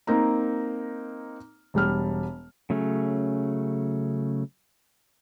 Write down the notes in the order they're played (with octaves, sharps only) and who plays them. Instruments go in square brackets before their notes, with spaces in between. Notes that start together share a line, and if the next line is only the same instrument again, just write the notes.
[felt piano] A#3 C4 D#4 A#5
E1 G3 F6
[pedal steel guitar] C#3 F#3 A3 C#4